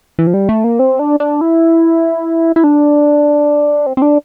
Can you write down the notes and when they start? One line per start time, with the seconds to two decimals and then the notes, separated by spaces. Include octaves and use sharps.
0.19 E3
0.27 F3
0.34 G3
0.49 A3
0.64 A#3
0.79 C4
0.99 D4
1.20 D4
1.41 E4
2.56 E4
2.64 D4
3.86 C4
3.97 C4
4.02 D4